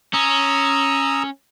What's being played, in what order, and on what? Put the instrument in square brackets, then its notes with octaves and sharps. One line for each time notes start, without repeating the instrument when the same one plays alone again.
[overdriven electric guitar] C#4 [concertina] A#5 D#6 E6